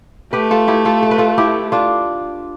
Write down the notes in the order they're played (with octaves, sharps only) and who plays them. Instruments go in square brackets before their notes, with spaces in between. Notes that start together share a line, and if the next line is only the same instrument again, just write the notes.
[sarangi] A3 [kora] G4 B4
[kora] F4 A4
E4 G4
F4 A4
A4
B4
F4 A4
E4 G4
D4 F4